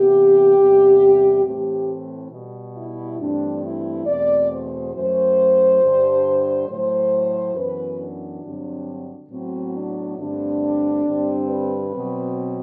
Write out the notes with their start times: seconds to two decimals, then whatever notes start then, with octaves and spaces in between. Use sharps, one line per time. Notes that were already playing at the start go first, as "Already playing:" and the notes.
Already playing: C3 E3 B3 G4
0.57 E2 C3 G3 B3
1.44 A2 E3 A3 C4 G4
2.31 B2 G3 B3
2.76 E4
3.18 G2 E3 A3 C4 D4
3.63 E4
4.06 E2 B2 A3 C4 D5
4.50 C5
4.93 F#2 F#3 A3 C5
5.80 G2 D3 G3
6.67 A2 F#3 A3 C5
7.55 F#2 E3 B3 B4
7.99 D4
8.43 G2 D3 F#3 C4
9.29 A2 F#3 B3 C4
9.73 D4
10.17 G2 D3 A3 C4 D4
11.05 G2 D3 G3 C4
11.48 B4
11.91 B2 F#3 C4